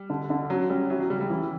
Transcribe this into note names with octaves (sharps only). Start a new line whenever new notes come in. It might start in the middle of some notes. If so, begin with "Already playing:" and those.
Already playing: G3
D3
D3
F#3 C#4
G3 C#4
F#3 E4
F#3
C#3 G3
G3
E3 E4